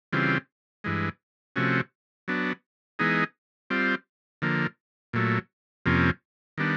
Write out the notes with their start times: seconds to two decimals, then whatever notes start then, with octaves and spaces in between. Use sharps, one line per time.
0.13 C#3 E3 G3 C4 F4
0.84 G2 E3 G#3
1.56 C3 F3 A3 C#4 F#4
2.28 F#3 B3 D4
2.99 E3 G#3 B3 D#4 G#4
3.70 G3 C4 F4
4.42 D3 F3 A#3
5.13 A#2 F#3 A3
5.86 F2 C3 F3 A#3 C#4
6.58 D#3 G3 B3 D4